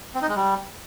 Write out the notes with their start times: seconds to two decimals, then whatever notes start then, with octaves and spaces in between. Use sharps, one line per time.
0.15 C4
0.22 D#4
0.29 G#3
0.36 G3